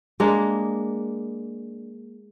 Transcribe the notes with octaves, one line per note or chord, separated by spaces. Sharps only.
G#3 A#3 D4